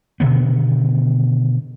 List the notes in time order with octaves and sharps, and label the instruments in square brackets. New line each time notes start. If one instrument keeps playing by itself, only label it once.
[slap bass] B2 D3 D#3 B3